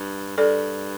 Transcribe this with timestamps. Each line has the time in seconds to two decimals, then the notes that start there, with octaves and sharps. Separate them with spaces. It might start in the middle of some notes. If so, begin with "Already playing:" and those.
Already playing: G2
0.37 G2 A4 D5